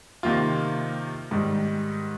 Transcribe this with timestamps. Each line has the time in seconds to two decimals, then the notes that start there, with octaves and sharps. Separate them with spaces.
0.23 C3 D#3 A#3 F4
1.31 G#2 D#3 G3